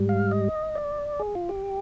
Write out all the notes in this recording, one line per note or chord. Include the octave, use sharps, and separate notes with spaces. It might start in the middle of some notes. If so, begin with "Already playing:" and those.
Already playing: G#2 G3
F5
D#5
D5
G#4
F4
G4